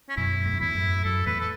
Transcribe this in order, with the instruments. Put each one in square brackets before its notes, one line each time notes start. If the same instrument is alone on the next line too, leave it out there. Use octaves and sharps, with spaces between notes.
[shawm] C#4
[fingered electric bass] F#2 B2 [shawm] E4
[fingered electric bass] A2
F#2
[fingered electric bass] E2 A2 [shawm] E4
[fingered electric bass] F#2
[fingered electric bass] F#2 [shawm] A4
[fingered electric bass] E2 A2 [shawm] B4
[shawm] A4